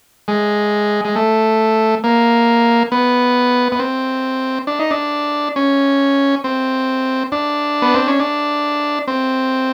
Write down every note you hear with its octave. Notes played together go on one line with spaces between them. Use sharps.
G#3
G#3
A3
A#3
B3
B3
C4
D4
D#4
D4
C#4
C4
D4
B3
C4
C#4
D4
C4